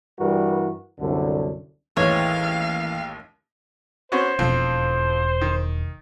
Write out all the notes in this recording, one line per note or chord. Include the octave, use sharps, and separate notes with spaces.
G2 E3 G3 F#4 A#4
C2 F#2 D3
A1 D#2 E3 G#3 C#5 F5
B3 C#4 F#4 C5
E1 F2
D#3